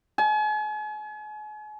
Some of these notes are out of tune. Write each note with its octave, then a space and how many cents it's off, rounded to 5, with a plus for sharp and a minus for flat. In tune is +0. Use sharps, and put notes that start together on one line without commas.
G#5 +40